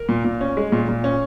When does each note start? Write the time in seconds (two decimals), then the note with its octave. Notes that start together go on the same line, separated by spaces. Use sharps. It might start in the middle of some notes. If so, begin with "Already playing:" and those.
Already playing: A#4
0.09 A#2
0.25 A#2
0.41 C#4
0.57 G#3
0.72 A#2
0.89 A#2
1.04 C#4